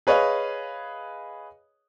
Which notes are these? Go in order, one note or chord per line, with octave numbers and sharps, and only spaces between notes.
G#4 B4 C#5 D#5 F5